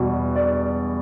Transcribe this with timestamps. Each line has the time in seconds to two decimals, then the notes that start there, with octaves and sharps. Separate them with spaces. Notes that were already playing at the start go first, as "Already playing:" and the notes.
Already playing: E2 B2 G3
0.36 D5